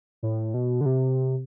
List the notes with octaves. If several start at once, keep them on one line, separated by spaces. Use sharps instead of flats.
A2
B2
D3
C3